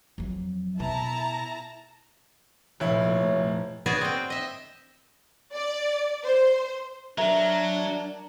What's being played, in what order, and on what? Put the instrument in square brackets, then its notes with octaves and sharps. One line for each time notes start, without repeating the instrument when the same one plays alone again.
[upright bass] F2 F#3
[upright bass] B2 [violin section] E4 A5 A#5
[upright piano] F1 E4 [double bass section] A#2 F3 A3 [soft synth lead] C#5
[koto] C#3 B3 F#4 G#4 D5 G#5
C4 G5
D#5 E5
[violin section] D5
C5
[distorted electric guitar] F#3 [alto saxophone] D4 [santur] A#4 [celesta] E5